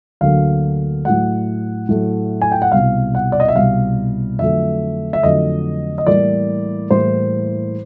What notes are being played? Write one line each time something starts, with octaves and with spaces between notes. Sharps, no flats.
D2 D3 F#3 A#3 F5
A2 F#3 A3 F#5
A2 F#3 A3
G#5
G5
F#5
C2 B2 G3 F5
F#5
D5
D#5
E5
C2 B2 G3 F5
F2 D3 F#3 A3 E5
E5
F2 D3 F#3 A3 D#5
D#5
A2 E3 G3 A#3 D5
A2 E3 G3 A#3 C5